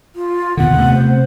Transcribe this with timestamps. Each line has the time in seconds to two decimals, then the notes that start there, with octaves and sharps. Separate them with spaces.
0.16 F4
0.57 D#2 B2 D3 F#5
0.78 C3 A3 B3
0.94 C5